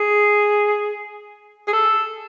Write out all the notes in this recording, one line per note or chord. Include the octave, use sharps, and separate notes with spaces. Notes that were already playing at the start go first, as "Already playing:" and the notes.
Already playing: G#4
G#4
A4